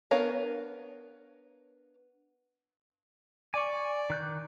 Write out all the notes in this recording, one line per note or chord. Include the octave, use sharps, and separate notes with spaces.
B3 D4 A#4 C#5 F5
D5 G#5 C#6
D#3 F#6 G6